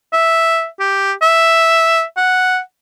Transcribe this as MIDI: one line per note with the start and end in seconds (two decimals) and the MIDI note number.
0.13 0.67 76
0.80 1.13 67
1.22 2.03 76
2.17 2.59 78